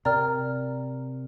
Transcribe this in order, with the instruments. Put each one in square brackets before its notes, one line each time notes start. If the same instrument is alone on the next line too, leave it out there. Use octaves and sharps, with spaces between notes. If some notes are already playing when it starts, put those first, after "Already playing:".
[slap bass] C3 [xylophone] A#4 D5 G5 A#5 F6